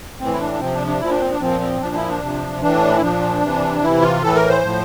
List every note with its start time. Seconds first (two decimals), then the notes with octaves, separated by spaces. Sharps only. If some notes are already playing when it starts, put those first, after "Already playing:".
0.20 A2 E3 C4
0.33 E4
0.39 D4
0.60 C3 F3 C4
0.73 D4
0.87 D4
1.00 A#2 F3 E4
1.11 D4
1.20 C4
1.31 D4
1.40 A#2 F3 C4
1.60 C4
1.81 A#2 F3 D4
1.95 E4
2.09 D4
2.21 C3 F3
2.61 A2 E3 D4
2.97 E4
3.01 A#2 F3 D4
3.42 C3 E3
3.81 C3 E3 E4
4.02 F4
4.22 A2 E3 A4
4.35 A#4
4.49 C5
4.63 A2 F3